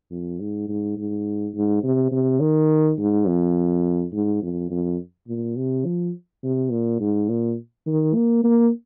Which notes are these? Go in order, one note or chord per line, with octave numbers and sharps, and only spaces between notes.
F2
G#2
G#2
G#2
G#2
C3
C3
D#3
G#2
F2
G#2
F2
F2
A#2
C3
F3
C3
A#2
G#2
A#2
D#3
A#3
A#3